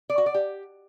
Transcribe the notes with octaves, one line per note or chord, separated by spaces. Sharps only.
D5
F#4
D5
G4